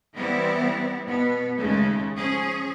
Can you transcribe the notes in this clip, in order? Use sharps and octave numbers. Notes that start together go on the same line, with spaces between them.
E3 G3 B3 C4 E4
B2 B3
D#2 C#3 G#3 A3
F3 C#4 G#4